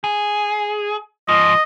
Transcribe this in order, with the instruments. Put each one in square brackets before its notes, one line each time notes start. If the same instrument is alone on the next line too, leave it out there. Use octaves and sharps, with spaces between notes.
[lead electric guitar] G#4
[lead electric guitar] G#2 F3 [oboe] D#5